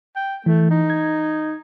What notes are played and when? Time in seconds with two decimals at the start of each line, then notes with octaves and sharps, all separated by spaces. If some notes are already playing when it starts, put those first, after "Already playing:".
0.16 G5
0.46 E3 A3
0.70 D#4
0.90 G#6